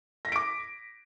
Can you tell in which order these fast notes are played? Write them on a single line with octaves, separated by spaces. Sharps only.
A#6 B6 D7 D6